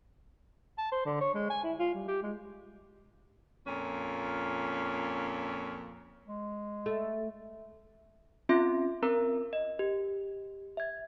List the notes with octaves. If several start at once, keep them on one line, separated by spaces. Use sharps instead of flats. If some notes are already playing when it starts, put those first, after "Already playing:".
A5
C5
D3
C#5
G#3
G#5
E4
F4
G3
G4
G#3
F2 A#2 C#4
G#3
A3
C4 C#4 F4 E5 C6
C4 A#4 A#5 E6
D#5
G4
E5 G#6